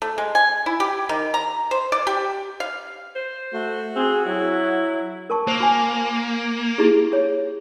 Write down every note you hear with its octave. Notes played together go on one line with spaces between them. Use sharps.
A3
G#3
G#5
E4
G4
D#3
A#5
C5
D5
G4
F5
C5
A3 F#4
C4 G#4
F#3 E4
A#4 A5 C#6
A#3 C5
F#4 G#5
E4 G4 G#4
G#4 C#5